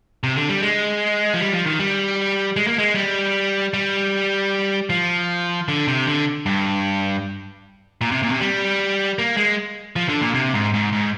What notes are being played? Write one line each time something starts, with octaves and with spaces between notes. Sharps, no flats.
C3
D3
G3
G#3
F3
G3
F3
D#3
G3
G#3
A#3
G#3
G3
G3
F3
D3
C3
D3
G2
A#2
C3
A#2
C3
G3
A#3
G#3
F3
D3
A#2
C3
G#2
G#2
G#2